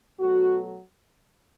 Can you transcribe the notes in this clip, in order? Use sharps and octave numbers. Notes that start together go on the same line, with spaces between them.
B2 F#3 A3 F#4